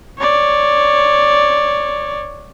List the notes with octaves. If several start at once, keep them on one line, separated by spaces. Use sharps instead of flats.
C#5 D5